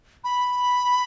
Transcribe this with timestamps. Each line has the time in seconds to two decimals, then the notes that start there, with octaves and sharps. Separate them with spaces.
0.24 B5